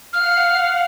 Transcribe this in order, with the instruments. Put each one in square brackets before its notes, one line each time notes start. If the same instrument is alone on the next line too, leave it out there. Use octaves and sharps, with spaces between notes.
[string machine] F5 F#5 [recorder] F6